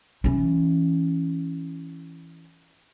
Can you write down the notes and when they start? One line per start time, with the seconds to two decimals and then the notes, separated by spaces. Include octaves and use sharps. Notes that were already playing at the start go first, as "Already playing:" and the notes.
0.24 E3 C#4